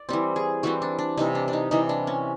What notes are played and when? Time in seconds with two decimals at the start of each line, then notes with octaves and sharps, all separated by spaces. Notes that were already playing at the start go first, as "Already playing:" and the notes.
Already playing: D5
0.09 E3 G3 C4
0.36 G#4
0.63 E3 G3 C4 F#4
0.82 D4
0.99 D4
1.17 C3 E3 G3 D#4
1.35 D4
1.48 D4
1.53 D#4
1.71 C3 E3 G3 D#4
1.89 D4
2.07 C#4